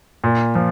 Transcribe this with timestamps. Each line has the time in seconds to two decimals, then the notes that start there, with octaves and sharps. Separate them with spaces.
0.24 A#2
0.55 F3